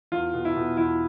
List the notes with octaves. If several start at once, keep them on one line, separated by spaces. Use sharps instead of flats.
E2 F4
B2
E4
B2
E2 E4